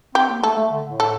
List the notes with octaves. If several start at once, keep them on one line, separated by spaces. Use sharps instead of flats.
C4 G4
A#3
A3 A4
A3
D3
A2
A4